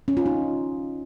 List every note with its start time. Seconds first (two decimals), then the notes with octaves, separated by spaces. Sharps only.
0.08 C#4
0.17 F4
0.26 D#4